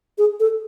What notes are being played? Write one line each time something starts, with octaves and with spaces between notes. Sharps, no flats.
G#4
A4